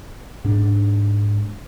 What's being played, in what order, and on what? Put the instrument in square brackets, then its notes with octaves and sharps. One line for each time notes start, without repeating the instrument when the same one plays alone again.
[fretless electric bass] G#2 D4